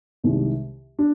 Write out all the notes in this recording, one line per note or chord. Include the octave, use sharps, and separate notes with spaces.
C2 C3 D#3 G#3
D4